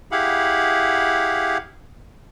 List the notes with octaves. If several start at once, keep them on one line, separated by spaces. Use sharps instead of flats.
E4 G4 G#4 F5 F#5 B5